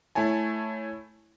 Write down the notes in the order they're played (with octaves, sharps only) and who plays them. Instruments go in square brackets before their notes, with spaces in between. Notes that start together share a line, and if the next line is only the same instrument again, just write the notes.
[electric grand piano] A3 E4 C#5 G#5 A5